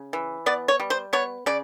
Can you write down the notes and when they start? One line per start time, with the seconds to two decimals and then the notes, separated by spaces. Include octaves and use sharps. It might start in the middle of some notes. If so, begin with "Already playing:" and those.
Already playing: C#3
0.13 E3
0.46 B3 D5
0.68 C#5
0.80 G3
0.90 C5
1.13 B3 C#5
1.46 C#3 D5